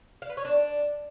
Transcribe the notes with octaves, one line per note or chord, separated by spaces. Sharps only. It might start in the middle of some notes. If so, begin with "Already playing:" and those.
F5
B4
C#5
D4